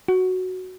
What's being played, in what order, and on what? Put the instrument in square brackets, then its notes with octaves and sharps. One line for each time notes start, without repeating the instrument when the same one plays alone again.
[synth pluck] F#4